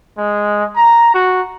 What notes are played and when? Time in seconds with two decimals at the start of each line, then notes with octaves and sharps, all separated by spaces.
0.18 G#3
0.76 A#5
1.14 F#4